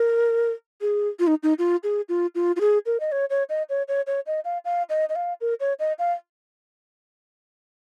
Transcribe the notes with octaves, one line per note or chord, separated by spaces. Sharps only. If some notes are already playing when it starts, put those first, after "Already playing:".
Already playing: A#4
G#4
F4
D#4
D#4
F4
G#4
F4
F4
F4
G#4
A#4
D#5
C#5
C#5
D#5
C#5
C#5
C#5
D#5
F5
F5
D#5
D#5
F5
A#4
C#5
D#5
F5